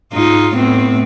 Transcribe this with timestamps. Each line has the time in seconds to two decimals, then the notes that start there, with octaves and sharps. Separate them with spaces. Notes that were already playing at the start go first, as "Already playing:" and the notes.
0.13 G#2 D#4 F4
0.55 A2 B3 C4